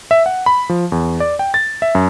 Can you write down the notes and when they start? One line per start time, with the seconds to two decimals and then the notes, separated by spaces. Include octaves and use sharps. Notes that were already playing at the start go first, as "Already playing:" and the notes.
0.11 E5
0.26 F#5
0.46 B5
0.69 F3
0.92 E2
1.20 D5
1.39 G5
1.54 A6
1.82 E5
1.95 F#2